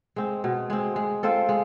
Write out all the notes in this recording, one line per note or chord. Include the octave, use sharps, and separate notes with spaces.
G#3 C4
B2
G#3 C4
G#3
C4 F4 A4
G#3